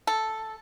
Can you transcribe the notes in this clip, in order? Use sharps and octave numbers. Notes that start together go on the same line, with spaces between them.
A4